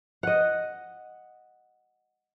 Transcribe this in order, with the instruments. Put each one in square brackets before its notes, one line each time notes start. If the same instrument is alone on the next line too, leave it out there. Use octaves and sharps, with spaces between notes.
[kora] D#5 F#5